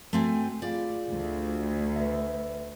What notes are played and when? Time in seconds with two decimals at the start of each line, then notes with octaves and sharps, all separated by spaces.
0.13 A3 C4 F#4 G#5
0.62 F4 G#4 D5 F5
1.11 D2
1.96 B4 E5